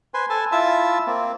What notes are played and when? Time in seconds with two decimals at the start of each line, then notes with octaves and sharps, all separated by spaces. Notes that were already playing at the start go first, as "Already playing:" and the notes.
0.14 B4 C5 G#5 C6
0.30 A4 G#5 A5
0.52 E4 F4 E5 A5 E6
1.07 A#3 C4